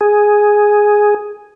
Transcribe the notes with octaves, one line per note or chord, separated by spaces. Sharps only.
G#4